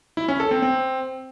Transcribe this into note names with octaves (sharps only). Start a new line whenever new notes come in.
E4
C#4
A4
C4
C4